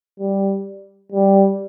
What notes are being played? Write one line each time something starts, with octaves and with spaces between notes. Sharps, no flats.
G3
G3